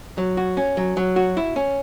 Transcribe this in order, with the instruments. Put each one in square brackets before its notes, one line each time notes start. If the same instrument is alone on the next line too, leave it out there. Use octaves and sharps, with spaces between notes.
[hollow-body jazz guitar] F#3
F#4
C#4
F#3
F#3
F#4
E4
C#4